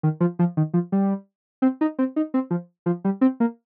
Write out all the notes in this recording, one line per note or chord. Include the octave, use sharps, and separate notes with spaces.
D#3
F3
F3
D#3
F3
G3
C4
D#4
C4
D#4
C4
F3
F3
G3
C4
A#3